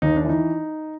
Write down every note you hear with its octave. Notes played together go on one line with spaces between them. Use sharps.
D#2 D#4
D4
E3
D#4